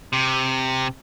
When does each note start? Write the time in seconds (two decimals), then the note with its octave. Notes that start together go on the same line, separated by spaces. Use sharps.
0.13 C3